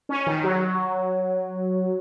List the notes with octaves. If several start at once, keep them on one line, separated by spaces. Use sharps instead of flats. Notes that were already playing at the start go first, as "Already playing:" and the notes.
C#4
D#3
F#3